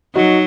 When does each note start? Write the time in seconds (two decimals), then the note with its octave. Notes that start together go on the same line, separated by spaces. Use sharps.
0.15 F#3 D#4 F#4